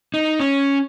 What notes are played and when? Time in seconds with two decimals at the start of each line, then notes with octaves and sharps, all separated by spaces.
0.14 D#4
0.39 C#4